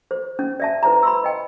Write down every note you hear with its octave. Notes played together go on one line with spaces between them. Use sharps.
C5
C#4
D5 E5 A5
E4 B4 C5 A5 A#5
B5 C6 E6
D#5 G5